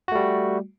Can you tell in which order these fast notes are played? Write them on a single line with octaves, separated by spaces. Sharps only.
F#4 A3 G3